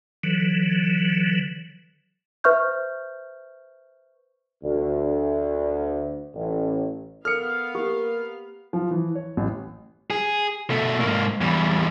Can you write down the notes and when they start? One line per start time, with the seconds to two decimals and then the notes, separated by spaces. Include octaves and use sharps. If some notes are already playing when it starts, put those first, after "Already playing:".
0.24 D3 E3 F#3
2.44 B4 C5 E5 C#6 F6 G6
4.63 D2
6.34 A1
7.25 B3 A4 A#4 F5 F6 C#7
7.75 A#3 G4
8.73 F3
8.91 E3
9.15 C#5
9.37 A1
10.10 G#4
10.70 B2 A3
11.00 G#2 A#3
11.41 E2 G3